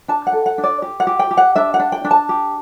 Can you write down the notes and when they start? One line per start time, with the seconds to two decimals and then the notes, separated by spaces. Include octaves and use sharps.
0.08 D4 A5
0.27 F#5
0.33 A4
0.46 F#5
0.58 D4
0.63 D5
0.82 G4
1.00 F#5
1.07 G4
1.19 G5
1.31 G4
1.37 F#5
1.55 D4 E5
1.74 F#5
1.79 D4
1.92 G5
2.04 D4
2.11 A5
2.29 G4